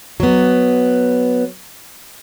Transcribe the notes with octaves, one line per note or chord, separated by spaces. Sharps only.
F#3 B3